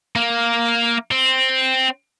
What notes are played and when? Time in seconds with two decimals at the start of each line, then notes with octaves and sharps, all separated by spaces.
0.16 A#3
1.11 C4